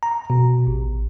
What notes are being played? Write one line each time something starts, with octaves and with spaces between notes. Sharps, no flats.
A#5
B2
A1